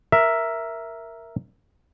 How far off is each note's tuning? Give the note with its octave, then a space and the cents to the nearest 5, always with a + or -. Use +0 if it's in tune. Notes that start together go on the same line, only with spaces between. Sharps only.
A#4 +0 E5 +0